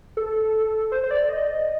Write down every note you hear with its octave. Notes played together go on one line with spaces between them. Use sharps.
A4
C5
C5
D5
D#5